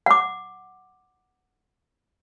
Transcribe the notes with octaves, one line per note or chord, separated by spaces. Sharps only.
F#5 D6